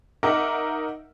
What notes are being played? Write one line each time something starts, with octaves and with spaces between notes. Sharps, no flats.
D#4 A#4 E5 F#5 D6